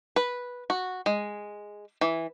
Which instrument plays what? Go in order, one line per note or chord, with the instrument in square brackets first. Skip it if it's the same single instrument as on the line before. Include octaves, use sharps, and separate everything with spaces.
[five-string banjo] B4
F#4
G#3
E3